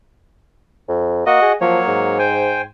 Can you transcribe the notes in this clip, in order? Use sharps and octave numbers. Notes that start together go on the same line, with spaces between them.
F2
A#3 F#4 D#5
G#4
F3 F#3 A#3 C#5
G#2
C5 G5 G#5